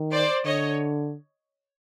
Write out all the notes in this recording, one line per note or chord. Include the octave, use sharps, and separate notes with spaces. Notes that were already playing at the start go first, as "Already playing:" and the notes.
Already playing: D#3
C5 D5
D3 C#5 D#5